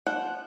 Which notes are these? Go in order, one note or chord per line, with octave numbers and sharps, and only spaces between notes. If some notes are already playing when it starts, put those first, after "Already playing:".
F3 F#5